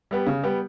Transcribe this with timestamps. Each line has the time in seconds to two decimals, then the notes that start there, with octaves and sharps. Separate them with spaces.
0.11 G3 B3 G4
0.27 C#3
0.44 G3 B3 G4